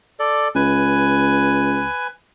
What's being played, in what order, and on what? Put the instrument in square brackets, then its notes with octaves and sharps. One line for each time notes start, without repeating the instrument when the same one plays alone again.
[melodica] A4 D5
[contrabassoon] C#2 [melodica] B4 G#5